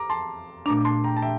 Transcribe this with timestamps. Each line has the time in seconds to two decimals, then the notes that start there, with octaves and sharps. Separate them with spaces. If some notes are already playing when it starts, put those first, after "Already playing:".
Already playing: A#5 D6
0.10 A5 C6
0.66 A#2 A3 D4 A#5 D6
0.85 A5 C6
1.04 G5 A#5
1.17 A5
1.22 E5 G5